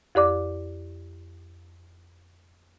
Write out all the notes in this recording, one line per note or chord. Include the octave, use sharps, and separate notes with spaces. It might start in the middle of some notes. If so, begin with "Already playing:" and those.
F2 G4 D5 D6